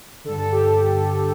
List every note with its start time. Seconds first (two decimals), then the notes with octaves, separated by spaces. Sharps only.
0.24 G2 D3 A4
0.38 A4
0.52 G4